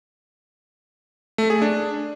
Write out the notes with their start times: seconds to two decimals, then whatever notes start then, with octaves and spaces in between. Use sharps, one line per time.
1.38 A3
1.50 G#4
1.62 D4